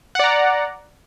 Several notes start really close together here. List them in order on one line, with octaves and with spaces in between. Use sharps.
F#5 D5 A#5